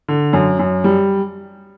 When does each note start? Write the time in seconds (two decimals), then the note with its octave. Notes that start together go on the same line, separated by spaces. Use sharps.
0.08 D3
0.33 F#2
0.59 F#2
0.84 G3